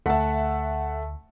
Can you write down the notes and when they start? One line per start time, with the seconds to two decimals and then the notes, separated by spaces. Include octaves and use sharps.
0.06 D2 A3 E5 F#5 A5